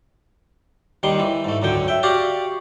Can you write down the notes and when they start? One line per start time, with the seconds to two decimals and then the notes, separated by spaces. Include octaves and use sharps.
1.03 D#2 D#3 G3 C6
1.19 E3
1.44 G#2 A3
1.62 C#2 F#2 D3 G5
1.88 E5 G5
2.03 F#4 G4 D5 F5